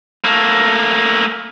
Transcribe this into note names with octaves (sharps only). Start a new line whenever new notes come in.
A3 A#3